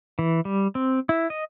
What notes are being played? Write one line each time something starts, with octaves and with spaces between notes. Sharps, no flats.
E3
G3
C4
E4
D#5